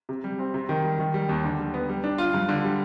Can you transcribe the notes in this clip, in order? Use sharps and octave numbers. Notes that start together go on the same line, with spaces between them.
C3
G3
C4
C3
D#3
G3
D#3
G3
D#2
D3
G3
B3
G3
D4
F4
G2
D3
G3